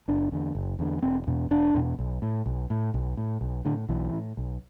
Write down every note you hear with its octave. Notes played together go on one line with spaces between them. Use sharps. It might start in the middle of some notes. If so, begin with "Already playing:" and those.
F#1 D4
E2 D3
F#1
E2 D3
E1 C4
E2 B2
E1 D4
E2 B2
B1
A2
B1
A2
B1
A2
B1
A2 D3
B1 E3
A2
B1